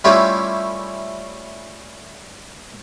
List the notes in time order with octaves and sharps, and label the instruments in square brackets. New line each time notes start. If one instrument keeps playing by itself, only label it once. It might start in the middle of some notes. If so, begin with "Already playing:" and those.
[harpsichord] G3 A3 C#4 E4 F4 G4